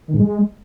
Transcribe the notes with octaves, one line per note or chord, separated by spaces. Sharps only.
D#3
G#2
G#3